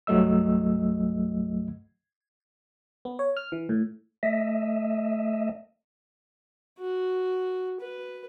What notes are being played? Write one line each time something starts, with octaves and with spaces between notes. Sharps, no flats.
C2 G2 F#3 A3 D#5 E6
B3
C#5
F6
E3
A2
A3 D#5 E5
F#4
B4